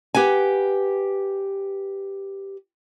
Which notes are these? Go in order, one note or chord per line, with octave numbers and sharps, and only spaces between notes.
G4 B4 F#5 G#5